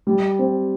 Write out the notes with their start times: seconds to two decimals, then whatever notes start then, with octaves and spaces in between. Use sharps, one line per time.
0.07 G3
0.39 C4